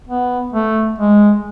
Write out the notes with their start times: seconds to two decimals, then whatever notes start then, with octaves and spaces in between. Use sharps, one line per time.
0.08 B3
0.53 A3
0.98 G#3